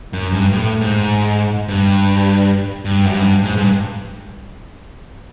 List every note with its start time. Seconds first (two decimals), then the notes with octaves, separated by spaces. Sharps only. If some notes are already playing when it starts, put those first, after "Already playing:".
0.13 F#2
0.32 G2
0.53 A2
0.81 G#2
1.68 G2
2.85 G2
3.06 F#2
3.14 G2
3.43 G#2
3.57 G2